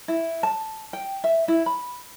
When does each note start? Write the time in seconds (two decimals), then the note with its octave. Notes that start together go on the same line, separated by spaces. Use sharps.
0.08 E4
0.43 A5
0.93 G5
1.24 E5
1.48 E4
1.66 B5